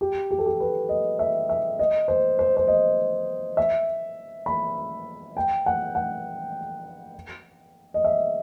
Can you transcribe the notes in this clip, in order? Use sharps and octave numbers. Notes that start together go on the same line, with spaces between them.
G4
G4
A4
G4
B4
D#5
E5
E5
D#5
C5
C5
C5
D#5
E5
B5
G5
F#5
F#5
D#5
E5